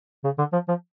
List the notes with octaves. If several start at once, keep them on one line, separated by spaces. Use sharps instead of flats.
C#3
D3
F3
F3